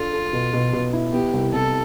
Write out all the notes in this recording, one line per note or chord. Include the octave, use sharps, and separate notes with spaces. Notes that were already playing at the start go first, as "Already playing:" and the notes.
Already playing: D4 F4 A4
A4
B2
B2
B2
E4
B3 G4
C2
C3 A4